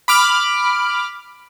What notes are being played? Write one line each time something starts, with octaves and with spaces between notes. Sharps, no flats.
B5 D6 F6